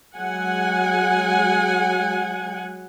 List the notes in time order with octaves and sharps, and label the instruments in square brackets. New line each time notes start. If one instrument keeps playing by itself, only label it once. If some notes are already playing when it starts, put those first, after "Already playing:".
[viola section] F#3 G#3 F#5 G#5